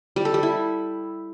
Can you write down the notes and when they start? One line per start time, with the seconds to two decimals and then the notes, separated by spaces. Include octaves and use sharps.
0.16 G3
0.25 A4
0.34 G3
0.43 E4